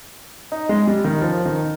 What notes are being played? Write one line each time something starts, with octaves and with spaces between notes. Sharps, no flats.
D#4
G#3
G3
D#3
F3
D#3